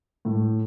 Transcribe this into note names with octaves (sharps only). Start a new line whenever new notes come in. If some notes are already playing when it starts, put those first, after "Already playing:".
A2